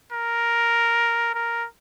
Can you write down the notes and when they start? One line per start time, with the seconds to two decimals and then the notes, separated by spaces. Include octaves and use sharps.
0.12 A#4
1.34 A#4